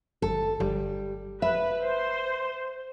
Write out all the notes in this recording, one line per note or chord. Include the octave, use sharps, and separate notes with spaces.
G1 A4
G1 G3
B4 E5
C5